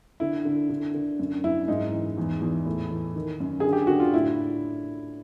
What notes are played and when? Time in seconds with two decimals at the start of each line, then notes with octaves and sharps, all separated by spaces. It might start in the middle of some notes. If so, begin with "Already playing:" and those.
0.20 D3 E4
0.45 D3
0.69 D3
0.94 D3
1.19 F#2
1.44 F#2 E4
1.68 G#2 D#4
1.92 E3
2.18 E2
2.41 E2
2.66 A2
2.90 E3
3.16 D#3
3.40 F#2
3.60 D3 G#4
3.73 G4
3.87 D3 F#4
4.00 F4
4.13 A2 E4